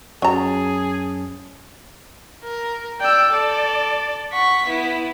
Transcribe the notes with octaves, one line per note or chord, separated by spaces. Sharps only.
F#2 F#3 C#4 G#4 A5 A#5
A#4
D5 G5 E6
A4 D5
F#5 C#6 B6
B3 E4